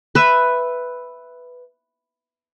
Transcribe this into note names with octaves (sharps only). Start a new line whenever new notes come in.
B4 E5